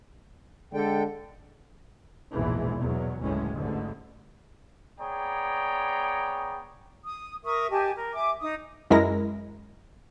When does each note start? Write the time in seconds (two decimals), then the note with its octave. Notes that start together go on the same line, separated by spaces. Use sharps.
0.74 D3 G#3 A4 G5
2.33 A#1 E2 G#2 B2 E3
2.79 E2 B2 F#3
3.21 F#1 D2 A2 E3 G#3 C#4
3.54 A1 G#2 D3
5.00 B3 G#4 C#5 D5 G5 A#5
7.03 D#6
7.44 A#4 E5 C#6 D#6
7.70 G4 D#5 G#5 A5
7.96 A#4
8.13 E5 G#5 D6
8.40 D#4 D#6
8.90 F#2 G#3 E4 A#4 A#6